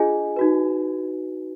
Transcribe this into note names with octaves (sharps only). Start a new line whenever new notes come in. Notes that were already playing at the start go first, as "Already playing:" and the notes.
Already playing: D4 F4 G#4 D#5 G#5
D#4 F#4 B4